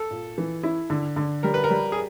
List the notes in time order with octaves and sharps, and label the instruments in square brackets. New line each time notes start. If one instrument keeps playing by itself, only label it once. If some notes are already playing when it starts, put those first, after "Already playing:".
Already playing: [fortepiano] A4
[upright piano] A#2
E3
E4
D3
D3
[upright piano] G3 [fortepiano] A#4
[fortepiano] B4
A#4
[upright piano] G3
[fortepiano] G#4